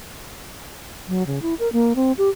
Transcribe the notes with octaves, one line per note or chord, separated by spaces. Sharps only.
F#3
C#3
E4
A#4
A#3
C4
G4